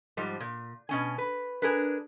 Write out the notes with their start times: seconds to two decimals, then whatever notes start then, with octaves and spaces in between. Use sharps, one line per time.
0.17 G#2 F3 G3
0.40 A#2
0.89 B2 C#4 G#5
1.18 B4
1.62 D4 G#4 A#4 B4